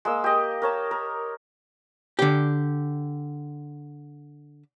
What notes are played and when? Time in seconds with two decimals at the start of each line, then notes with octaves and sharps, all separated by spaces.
0.05 G#3 A#3 E6
0.24 G4 D#5
0.62 A#4 C#5 A5
0.91 A#4
2.19 D3 G4